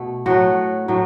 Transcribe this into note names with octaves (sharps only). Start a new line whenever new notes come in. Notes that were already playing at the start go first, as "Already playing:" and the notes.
Already playing: B2 A3
A2 F#3 A3 F#4
A2 F#3 A3